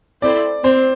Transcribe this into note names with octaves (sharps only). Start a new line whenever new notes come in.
C4 E4 A4 C5 D5
C4 C5